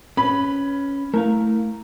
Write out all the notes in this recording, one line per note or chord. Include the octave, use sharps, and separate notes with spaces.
C#4 B4 B5
A3 E4 A#4 F5